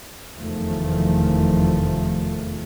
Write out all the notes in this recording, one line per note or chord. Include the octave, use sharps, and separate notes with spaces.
F1 E2 D#3 F3 A3